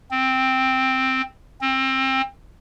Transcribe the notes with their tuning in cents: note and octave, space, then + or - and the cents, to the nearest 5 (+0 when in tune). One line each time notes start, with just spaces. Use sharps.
C4 +0
C4 +25